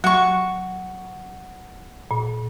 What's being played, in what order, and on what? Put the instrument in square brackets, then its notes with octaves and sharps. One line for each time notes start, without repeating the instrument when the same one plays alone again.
[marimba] F#3 [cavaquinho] F#4 C#6
[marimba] A#2